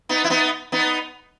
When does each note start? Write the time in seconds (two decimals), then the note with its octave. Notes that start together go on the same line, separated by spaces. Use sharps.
0.09 B3 D#4
0.24 E4
0.30 B3 D#4
0.72 B3 D#4